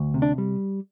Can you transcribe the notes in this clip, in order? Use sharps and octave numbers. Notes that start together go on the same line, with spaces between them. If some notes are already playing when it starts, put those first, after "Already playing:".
Already playing: D2
C3
D4
G3